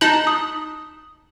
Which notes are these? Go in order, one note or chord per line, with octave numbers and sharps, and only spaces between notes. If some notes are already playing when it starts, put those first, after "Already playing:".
D#4 A5 F#6 F#7
D#6